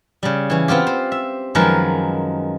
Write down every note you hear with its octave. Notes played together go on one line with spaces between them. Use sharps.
C#3 G3
E3 C#4
B3 C4 F4 G4
C5
E5
F#2 D#3 F3 G#3 A#4 B4